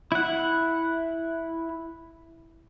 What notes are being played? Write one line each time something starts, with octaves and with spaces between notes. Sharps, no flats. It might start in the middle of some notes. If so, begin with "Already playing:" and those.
E4 F#5